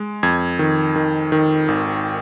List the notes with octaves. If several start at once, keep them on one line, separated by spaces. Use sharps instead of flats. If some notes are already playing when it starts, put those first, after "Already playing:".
Already playing: G#3
F2 G#6
D#3
D#3
D#3
G#1